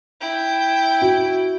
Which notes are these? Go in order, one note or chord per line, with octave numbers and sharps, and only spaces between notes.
E4 G5
F#4